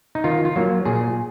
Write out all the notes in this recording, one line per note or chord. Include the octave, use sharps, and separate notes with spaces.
D#4
D#3 F4
F4
F#3 A#3
A#2 G#4